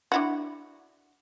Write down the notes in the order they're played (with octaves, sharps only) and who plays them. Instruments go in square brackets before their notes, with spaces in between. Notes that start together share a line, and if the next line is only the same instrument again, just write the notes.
[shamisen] D4 E4 F#4